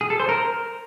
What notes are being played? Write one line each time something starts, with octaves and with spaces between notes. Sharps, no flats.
G#4
A4
C5
A#4